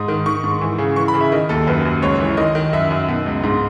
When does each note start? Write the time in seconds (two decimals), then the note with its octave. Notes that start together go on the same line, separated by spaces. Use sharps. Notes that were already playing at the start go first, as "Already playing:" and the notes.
Already playing: G#2 D#6
0.08 D#3
0.26 D#3 C#6
0.44 G#2
0.61 E3
0.78 C#3
0.96 E3 C#6
1.08 B5
1.14 C#3
1.21 E5
1.32 D#3 D#5
1.49 D#2 A4
1.67 F#2 B4
1.85 F#2
2.02 C#2 C#5
2.20 E3
2.37 D#3 D#5
2.55 D#3
2.73 F#2 E5
2.91 F#2
3.08 B2
3.26 C#2
3.44 G#2